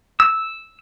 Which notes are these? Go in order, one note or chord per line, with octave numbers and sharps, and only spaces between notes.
E6